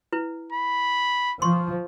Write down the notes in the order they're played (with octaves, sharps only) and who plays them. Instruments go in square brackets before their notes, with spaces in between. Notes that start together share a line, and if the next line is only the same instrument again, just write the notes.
[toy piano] E4 B4
[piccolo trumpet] B5
[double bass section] F3 [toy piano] C6 C#6